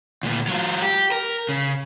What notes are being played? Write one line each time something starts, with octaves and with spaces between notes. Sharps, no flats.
D2 A#2
F#3 F4
G4
A#4
C#3